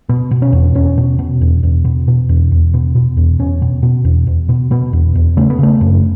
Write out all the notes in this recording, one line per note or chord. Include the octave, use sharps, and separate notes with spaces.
B2 B3
B2
C#4
E2
E2 C#4
B2
B2
E2
E2
B2
B2
E2
E2
B2
B2
E2
E2 C#4
B2
B2
E2
E2
B2
B2 B3
E2
E2
C#3 A3
B3
C#3 A3
F#2